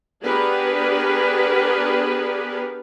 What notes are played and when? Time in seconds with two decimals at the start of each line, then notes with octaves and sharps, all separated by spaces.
0.23 B3 D4 G4 G#4 A#4 B4